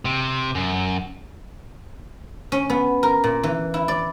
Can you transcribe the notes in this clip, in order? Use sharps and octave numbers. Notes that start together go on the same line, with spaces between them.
C3
F#2
C#4
B3
A#4
A#2
E3
E4
D5